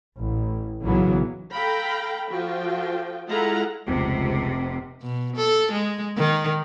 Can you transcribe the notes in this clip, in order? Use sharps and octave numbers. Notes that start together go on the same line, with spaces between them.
A1
B1 A#2 C#3 E3 F#3 B3
A4 F5 G5 A#5 B5
F3 F4 F#4 A4 G5
G#3 E4 F4 A4 F#5 A#5
F1 C#2 C3
B2
A4
G#3
D#3